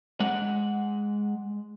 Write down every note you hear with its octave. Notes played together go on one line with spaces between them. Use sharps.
G#3 F#5